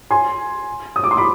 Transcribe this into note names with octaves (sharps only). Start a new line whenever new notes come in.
G#5 C6
D#6
D6
C6
B5 D6